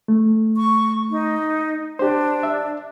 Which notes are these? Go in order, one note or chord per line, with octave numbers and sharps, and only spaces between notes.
A3
C#6
D#4
D4 G4 C5
E5